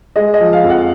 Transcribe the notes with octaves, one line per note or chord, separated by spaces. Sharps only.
G#3 D#5
D#5
F3
F5
F2
F#5